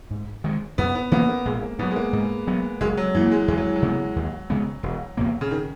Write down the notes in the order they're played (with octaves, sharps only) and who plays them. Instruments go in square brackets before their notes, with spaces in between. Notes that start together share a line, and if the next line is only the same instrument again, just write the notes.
[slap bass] G#2
D#3 G#3
[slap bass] F#2 [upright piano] B3
[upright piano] B3
[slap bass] E3 A#3 C#4 [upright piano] B3
[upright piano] A#3
[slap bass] A#1 [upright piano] G#3
[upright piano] A#3
[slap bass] G#2 [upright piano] B3
[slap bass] F#3
[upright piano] G#3
A#3
[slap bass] G#2
F#3 B3
[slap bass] F#1 [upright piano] G#3
[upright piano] F#3
[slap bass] F#2 D#3 A#3 [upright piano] E3
[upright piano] G#3
[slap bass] E2 [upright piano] G#3
[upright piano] F#3
E3
F#3
[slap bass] C#3 G#3 B3
D#2
C#3 G#3 B3
E1
E2 B2 A#3
[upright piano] C#3
D#3